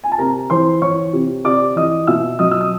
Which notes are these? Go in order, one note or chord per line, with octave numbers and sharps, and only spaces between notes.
G#5
A5
C3 A#4 A#5
E3 C5 C6
E3 C#5 C#6
C3
C3 D5 D6
E3 D#5 D#6
B2 E5 E6
F#3 D#5 D#6
E6
D#6